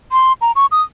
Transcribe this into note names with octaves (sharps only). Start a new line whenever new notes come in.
C6
A#5
C#6
D#6